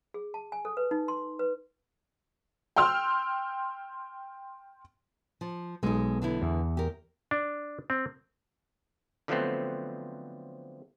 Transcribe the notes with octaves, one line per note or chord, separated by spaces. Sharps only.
G#4
A5
G#5
A4
B4
D#4
C6
B4
G5 C6 E6 F6
F3
B1 G#3 D#4
D3 B3 E4
E2
G4 A#4
D4
C4
D3 F3 F#3 A3 B3 C4